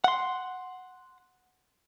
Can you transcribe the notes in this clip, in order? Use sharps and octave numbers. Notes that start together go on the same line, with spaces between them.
F#5 C6